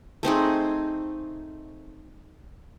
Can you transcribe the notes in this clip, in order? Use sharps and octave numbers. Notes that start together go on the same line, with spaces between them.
A3 C4 D#4 G#4